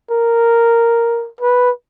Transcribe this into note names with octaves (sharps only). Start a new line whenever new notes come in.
A#4
B4